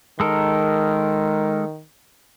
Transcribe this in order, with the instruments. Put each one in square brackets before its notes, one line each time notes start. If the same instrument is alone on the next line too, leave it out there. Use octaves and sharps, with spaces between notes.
[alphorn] D#3 [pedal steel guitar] G#3 A4 A#4